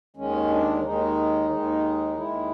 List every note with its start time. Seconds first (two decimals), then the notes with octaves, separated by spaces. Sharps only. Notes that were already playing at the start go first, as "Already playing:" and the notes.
0.17 D#2 D#3 G#3 C#4
0.50 D4
0.78 D4
0.83 D#2 D#3 G#3 D#4
1.50 D#2 D#3 G#3
2.16 D#2 D#3 G#3 E4